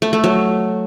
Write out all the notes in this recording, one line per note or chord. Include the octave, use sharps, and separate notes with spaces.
A3
A3
F#3